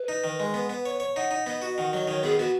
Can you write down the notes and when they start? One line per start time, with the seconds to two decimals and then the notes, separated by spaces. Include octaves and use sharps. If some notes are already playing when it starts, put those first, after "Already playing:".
Already playing: B4
0.08 D#4
0.24 D#3
0.40 G#3
0.54 B3
0.69 B3
0.86 C#5
1.00 C#5
1.16 D#4 F#5
1.31 D#4
1.46 B3 D#5
1.62 F#4
1.78 D#3 F#5
1.92 F#3 D#5
2.08 D#3 C#5
2.23 B3 G#4
2.39 B3 F#4